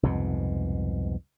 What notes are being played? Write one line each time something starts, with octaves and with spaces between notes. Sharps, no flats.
C2 F2 G#2 B2